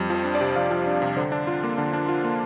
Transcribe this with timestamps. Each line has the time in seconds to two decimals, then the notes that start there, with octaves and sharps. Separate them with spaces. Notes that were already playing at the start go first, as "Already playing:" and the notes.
Already playing: F2 G3
0.10 F3 C5
0.24 D4
0.35 D5
0.41 C3
0.56 F2 F5
0.71 F3
0.86 D4
1.02 C3
1.16 D3 C5
1.32 D4
1.47 F4
1.64 A#3
1.78 D3
1.93 D4
2.09 F4
2.24 A#3